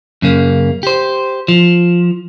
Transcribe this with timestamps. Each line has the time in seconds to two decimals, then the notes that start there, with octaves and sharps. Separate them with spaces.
0.22 F#2 C#3 A#3
0.83 G4 C5
1.48 F3